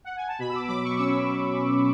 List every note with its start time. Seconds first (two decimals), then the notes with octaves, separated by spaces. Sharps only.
0.05 F#5
0.16 G#5
0.28 A5
0.39 B2 B5
0.49 E6
0.54 D6
0.68 F#3 D6
0.83 C#6
0.98 C#4 E6